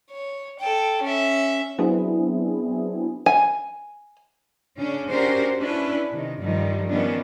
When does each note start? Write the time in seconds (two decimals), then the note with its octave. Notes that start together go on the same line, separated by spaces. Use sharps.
0.10 C#5
0.59 A4 G5
1.02 C#4 E5
1.78 F#3 B3 C4 D4 E4 G#4
3.26 G#5
4.77 C#3 C#4 D4
5.09 C#4 D4 F#4 G4 A#4 C5
5.59 C#4 D4 E4 B4
6.10 C3 D#3
6.40 G2 D3 D#3 F3 G3
6.89 D#3 F3 G3 B3 C#4 D4